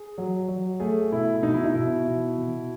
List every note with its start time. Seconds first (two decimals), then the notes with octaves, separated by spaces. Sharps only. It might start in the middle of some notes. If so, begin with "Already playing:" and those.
Already playing: G#4
0.18 F#3
0.48 F#3
0.80 A3 G#4
1.12 B2 E4
1.43 B2 D#4
1.54 E4
1.64 D#4
1.75 B2 E4
2.07 B2
2.38 B2